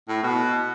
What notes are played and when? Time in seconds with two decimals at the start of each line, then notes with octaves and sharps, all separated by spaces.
0.08 A2
0.23 B2